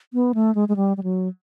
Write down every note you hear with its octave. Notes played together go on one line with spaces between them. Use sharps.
B3
A3
G#3
G#3
G3
G3
F#3